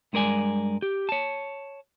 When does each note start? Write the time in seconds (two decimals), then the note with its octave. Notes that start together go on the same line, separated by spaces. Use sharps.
0.13 G2 G#3 A#4 D5 G#5
0.82 G4
1.09 C#5 A5